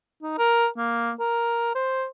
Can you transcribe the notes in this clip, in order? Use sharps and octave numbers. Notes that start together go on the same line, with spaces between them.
D#4
A#4
A#3
A#4
C5